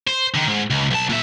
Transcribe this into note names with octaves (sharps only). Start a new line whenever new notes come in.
C5
D3 D#3
G#2
C#2
B1 A5
A#2 E5